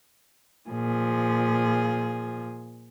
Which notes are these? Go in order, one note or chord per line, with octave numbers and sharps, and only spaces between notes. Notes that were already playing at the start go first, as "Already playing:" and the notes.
A#2 F3 G#4